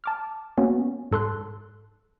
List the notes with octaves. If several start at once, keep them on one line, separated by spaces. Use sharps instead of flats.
A5 D6 F6
A#3 B3 C#4 F#4
G#2 A4 C6 F#6